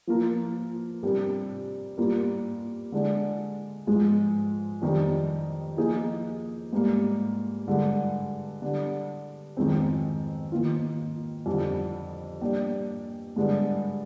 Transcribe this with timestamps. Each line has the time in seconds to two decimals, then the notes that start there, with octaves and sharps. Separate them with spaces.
0.07 F3 A#3 F4 A#4
1.03 C3 G3 D4 G4 A#4
1.97 G3 A#3 F4 A#4
2.92 D3 G#3 D4
3.87 G#2 F3 G#3
4.82 F2 D#3 G3 D4
5.77 F3 A#3 D#4 G#4
6.73 G#2 G3 A#3
7.67 G2 D3 G#3
8.62 D3 G3 D4
9.57 F2 D#3 G#3 C4
10.52 D#3 A#3 F4
11.46 F2 D3 G3 D4
12.41 G3 A#3 D4 G4
13.36 G2 D3 G#3 D4